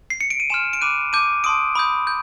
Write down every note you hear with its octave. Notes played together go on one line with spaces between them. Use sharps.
C7
C#7
D7
D#7
G#5 C6 F6 E7
D7
B5 D6 F#6 D#7
A5 D6 G6 D#7
A5 C6 D#6 D7
B5 D#6 G6
G6